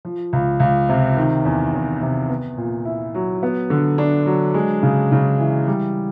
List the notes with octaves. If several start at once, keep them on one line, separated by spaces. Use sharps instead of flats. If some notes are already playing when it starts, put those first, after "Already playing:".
F3
C#2
C#2
C3
D#3
E2
E2
C3
B3
A#2
E4
F#3
B3
D3
D4
F#3
G#3
C#3
C#3
E3
G3